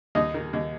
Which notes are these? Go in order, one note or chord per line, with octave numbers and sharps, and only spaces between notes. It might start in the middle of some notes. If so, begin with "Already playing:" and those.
D#2 D#4 D#5
D#3
D#2